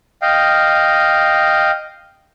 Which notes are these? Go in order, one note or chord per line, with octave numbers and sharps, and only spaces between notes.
D#5 F5 G5